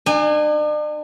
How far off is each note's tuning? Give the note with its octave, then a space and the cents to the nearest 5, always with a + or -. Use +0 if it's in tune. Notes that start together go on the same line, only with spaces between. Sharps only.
D4 +45 G#5 -20